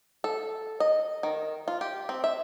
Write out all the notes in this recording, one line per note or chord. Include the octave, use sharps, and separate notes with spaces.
A4
D#5
D#3
F4
G4
C4
E5